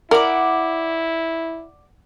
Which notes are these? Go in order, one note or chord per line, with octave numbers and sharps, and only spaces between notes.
E4 A#4 D5 F#5 D6